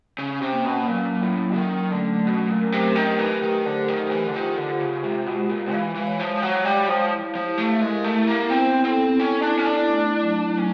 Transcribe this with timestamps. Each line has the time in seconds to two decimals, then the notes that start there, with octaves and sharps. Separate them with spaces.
0.18 C#3 C#4
0.42 C3
0.52 A#3
0.65 B2
0.87 A#2 F#3
1.21 A2 F#3
1.56 D#3 C#4
1.91 D3 A3
2.26 B2 A3
2.50 A#2
2.60 A#4
2.72 C3
2.95 D#3 G4
3.19 E3
3.30 G4
3.42 D#3
3.65 D3 C5
3.88 D#3
3.99 G4
4.11 E3
4.27 D3
4.34 D#3 F4
4.57 D3
4.69 F4
4.80 C#3
5.03 C3 G#3
5.26 B2
5.39 G#3
5.49 A#2
5.73 E3 F5
5.95 E3
6.07 C#5
6.20 F3
6.42 F#3 C#5
6.65 G3
6.77 F5
6.88 F3
7.12 E4
7.35 F3
7.46 G4
7.58 A3
7.81 G#3 A#4
8.04 A3
8.15 E4
8.27 A#3
8.50 B3 C4
8.84 C4 A4
9.20 C#4 E4
9.42 D4
9.55 C#4 E4
9.65 D4
9.89 A3
10.23 F#3
10.58 F#3 C#4